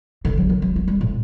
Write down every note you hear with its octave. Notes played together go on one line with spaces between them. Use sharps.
D3
F#3
D#3
F#3
F#3
G3
A2